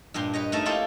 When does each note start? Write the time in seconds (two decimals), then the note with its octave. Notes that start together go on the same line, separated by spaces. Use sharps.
0.14 G2 A#2 G4 C6
0.33 B4 C#5 D#5
0.52 A3 C#4 D#4 D#5 E5 A5
0.66 A#3 E4 F4 G4 A4